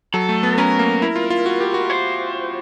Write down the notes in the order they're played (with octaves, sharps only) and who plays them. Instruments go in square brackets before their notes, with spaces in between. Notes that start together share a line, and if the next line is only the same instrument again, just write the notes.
[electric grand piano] F#3 [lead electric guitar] A4
[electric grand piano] A3
B3
[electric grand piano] C#4 [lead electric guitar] A#4
[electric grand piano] A#3
E4
F4
F4
F#4
G4
F#4
[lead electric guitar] C5